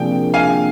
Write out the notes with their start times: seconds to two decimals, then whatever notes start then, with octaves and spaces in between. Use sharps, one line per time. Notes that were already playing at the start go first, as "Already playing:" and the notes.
Already playing: C3 F3 A#3 D4 G#4 G5
0.34 F5 G#5